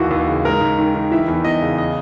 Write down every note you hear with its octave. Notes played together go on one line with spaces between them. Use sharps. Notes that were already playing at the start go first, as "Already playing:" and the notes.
Already playing: D#2 E3 F#4
D#2
C#3
G#2 A#4
G#2
D#3
D#3
E3 E5
E2
E2 D#5
C#3
D#5